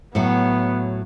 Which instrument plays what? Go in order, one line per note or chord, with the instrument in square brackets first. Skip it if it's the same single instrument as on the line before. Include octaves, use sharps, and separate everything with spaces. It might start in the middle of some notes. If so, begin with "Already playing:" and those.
[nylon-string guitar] A2 F#3 [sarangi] B3